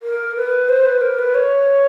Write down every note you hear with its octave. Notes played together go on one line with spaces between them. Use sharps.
A#4
B4
C5
B4
A#4
B4
C#5